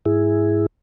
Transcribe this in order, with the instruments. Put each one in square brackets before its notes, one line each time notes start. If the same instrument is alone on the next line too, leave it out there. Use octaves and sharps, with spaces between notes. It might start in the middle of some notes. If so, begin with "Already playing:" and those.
[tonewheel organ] G#2 E4 G#4